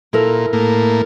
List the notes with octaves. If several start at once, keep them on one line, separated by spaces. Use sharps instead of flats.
A#2 E4 A4 A#4
A2 A#3